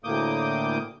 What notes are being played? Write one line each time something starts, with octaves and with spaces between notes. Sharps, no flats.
D2 A2 A#3 D6 D#6 G6